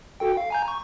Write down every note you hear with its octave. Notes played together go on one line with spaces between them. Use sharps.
F#4 A4 G5
F5
G#5 A#5 G6
C#6